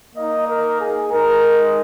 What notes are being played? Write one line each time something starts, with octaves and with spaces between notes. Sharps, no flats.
A#3 D#4 D#5
A#4
G#4
G#3 D#4 A#4